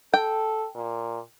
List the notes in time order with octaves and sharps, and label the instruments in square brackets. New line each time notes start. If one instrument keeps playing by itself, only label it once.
[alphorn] A4 [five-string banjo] G5
[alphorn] A#2